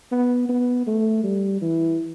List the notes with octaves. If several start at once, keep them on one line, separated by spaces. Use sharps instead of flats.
B3
B3
A3
G3
E3